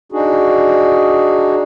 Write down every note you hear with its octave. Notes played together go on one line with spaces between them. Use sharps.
D4 D#4 F#4 G#4